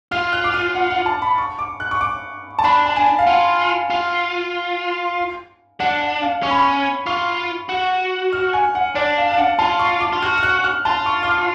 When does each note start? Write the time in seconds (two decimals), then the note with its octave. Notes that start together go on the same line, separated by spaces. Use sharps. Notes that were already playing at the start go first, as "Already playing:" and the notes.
0.11 F4 F6
0.33 F#6
0.44 D6
0.54 F6
0.75 F#5
0.90 F#5
1.06 A5
1.22 B5
1.38 C#6
1.59 D6
1.80 F#6
1.91 C#6
2.01 D6
2.59 A5
2.64 D4 B5
2.86 A5
2.96 G#5
3.19 F5
3.27 F4 F#5
3.90 F4
5.80 D4 F#5
6.02 F#5
6.22 F5
6.43 C#4 C#6
6.51 B5
6.59 C#6
7.06 F4 C#6
7.69 F#4
8.33 F6
8.53 G#5
8.75 F#5
8.95 D4 D5
9.18 F5
9.32 F5
9.38 F#5
9.59 F4 A5
9.80 C#6
10.01 D6
10.13 F4
10.22 F#4 F6
10.38 F6
10.43 F#6
10.64 F6
10.85 F4 A5
11.06 C#6
11.23 F6
11.28 D6